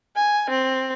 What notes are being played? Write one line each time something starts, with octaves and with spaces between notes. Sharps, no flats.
G#5
C4